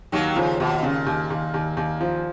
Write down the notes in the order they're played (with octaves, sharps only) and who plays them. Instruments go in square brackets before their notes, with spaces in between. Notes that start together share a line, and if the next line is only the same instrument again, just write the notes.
[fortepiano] D#2 [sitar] D#3 F#3
[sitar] C#3 [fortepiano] F3
[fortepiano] D#2 [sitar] B2
[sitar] A#2 [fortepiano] C#3
[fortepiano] D#2
D#2
D#2
D#2
F3